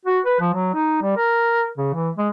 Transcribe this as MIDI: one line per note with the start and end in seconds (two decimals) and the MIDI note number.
0.06 0.20 66
0.26 0.37 71
0.40 0.52 53
0.53 0.72 54
0.74 0.97 63
1.02 1.15 55
1.17 1.67 70
1.78 1.90 49
1.93 2.10 52
2.18 2.30 56